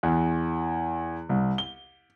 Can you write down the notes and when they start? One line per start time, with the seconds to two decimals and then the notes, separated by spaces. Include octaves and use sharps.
0.03 E2
1.29 C2
1.58 G7